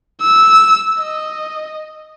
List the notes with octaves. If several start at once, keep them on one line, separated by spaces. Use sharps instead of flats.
E6
D#5